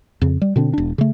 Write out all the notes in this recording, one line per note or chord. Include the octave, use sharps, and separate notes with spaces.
F2 C#3
G3
B2 D3 C4 D4
E1 D4
C#3 A3